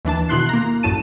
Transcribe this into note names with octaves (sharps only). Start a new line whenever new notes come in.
D#2 E3 D4 A5
B2 D#3 E4 C6 F#6 C7
A#3 A#5
A1 F#2 A2 A5 D#7